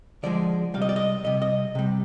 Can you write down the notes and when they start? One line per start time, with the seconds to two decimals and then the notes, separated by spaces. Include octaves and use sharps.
0.23 D3 F3 G#3 D5
0.74 C3 G3 F5
0.82 D#5
0.89 D5
0.96 D#5
1.24 C3 G3 D#5
1.42 D#5
1.75 C3 G3